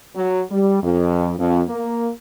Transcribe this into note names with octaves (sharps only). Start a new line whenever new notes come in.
F#3
G3
F2
F2
A#3